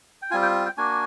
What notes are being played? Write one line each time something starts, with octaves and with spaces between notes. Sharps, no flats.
G5
G3 C4 F4 G#5
G5
G5
A#3 D4 F#4 G#5